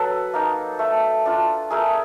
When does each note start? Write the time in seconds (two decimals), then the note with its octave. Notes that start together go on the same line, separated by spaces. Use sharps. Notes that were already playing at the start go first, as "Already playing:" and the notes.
Already playing: F#3 A4 B4
0.34 A#3 D#4
0.79 A3
1.26 D4 F4
1.70 A3 G#4 A#4